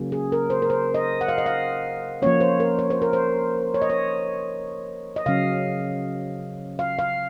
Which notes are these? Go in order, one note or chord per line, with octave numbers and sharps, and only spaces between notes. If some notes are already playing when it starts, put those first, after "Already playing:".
Already playing: C#3 F#3 A#3 C#4
G#4
A#4
C5
A#4
C5
D#5
F#5
F5
D#5
F5
F3 A#3 C#4 C#5
C5
A#4
C#5
C5
A#4
C5
C#5
D#5
C#5
D#5
C#3 F#3 C#4 F5
F5
F5